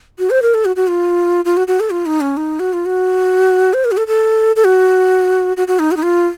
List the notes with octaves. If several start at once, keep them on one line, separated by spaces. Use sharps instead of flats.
F#4
C5
A#4
A4
F#4
F#4
F4
F4
F#4
F#4
A4
F4
D#4
C#4
D#4
F#4
F4
F#4
C5
A#4
F#4
A4
A4
A4
F#4
F#4
F#4
D#4
F#4
D#4
F4